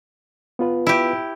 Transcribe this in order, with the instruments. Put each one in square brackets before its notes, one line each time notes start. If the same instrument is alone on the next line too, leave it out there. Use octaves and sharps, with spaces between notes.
[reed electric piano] B3 F4 B4
[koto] E4 G4